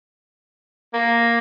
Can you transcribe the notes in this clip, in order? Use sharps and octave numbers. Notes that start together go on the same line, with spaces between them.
A#3